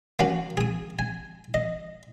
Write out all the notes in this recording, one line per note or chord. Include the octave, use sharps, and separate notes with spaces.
A#3 C#4 F#4
G#4 D#6
G#5
D#5